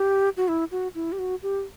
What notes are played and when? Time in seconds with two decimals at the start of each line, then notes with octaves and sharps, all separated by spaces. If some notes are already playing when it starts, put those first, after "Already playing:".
Already playing: G4
0.37 F#4
0.48 E4
0.71 F#4
0.95 E4
1.12 G4
1.19 F#4
1.43 G4